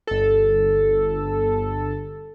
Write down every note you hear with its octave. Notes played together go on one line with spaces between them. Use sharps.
G1 A4